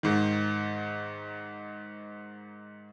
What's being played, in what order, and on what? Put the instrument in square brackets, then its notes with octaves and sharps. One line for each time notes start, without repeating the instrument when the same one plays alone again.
[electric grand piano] G#2 D#3